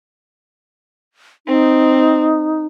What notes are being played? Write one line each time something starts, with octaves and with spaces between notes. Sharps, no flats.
C4 D#4